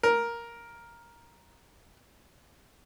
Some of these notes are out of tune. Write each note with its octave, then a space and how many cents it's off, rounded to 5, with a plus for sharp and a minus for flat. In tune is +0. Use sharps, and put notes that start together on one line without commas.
A#4 +5